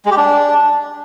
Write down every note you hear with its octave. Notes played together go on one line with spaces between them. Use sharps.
G#3
G4
D4